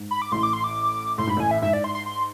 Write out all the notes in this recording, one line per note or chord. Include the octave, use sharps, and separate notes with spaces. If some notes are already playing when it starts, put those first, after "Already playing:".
Already playing: G#2
B5
D6
A1 A2 C6
D6
C6
D6
A2 C6
G#2 B5
A1 A2 G#5
E5
G#2 E5
D5
C6
C6
C6